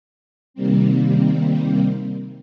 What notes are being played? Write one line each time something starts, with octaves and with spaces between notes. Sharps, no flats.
C3 D#3 G3 A#3 C4